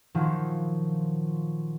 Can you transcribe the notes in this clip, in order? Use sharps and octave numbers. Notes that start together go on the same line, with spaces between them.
A#2 D#3 F3 F#3